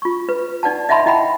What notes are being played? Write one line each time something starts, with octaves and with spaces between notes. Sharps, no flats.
F4 C#6
B4
D#4 D5 F#5 A5
D#5 E5 F#5 A5 B5 C6
E4 D#5 F#5 G5 B5